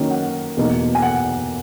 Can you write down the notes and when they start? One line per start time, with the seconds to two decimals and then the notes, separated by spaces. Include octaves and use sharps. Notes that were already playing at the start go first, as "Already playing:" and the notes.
Already playing: D#3 F#3 A#3 C#4
0.11 F#5
0.57 E2 B2 A#3 D#4
0.95 G#5
1.02 F#5